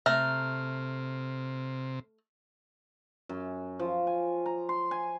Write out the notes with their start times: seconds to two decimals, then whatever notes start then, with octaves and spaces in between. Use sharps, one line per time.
0.06 C3 A3 A#5 F6
3.29 F#2
3.79 F3
4.07 G#5
4.46 A#5
4.69 C6
4.91 G#5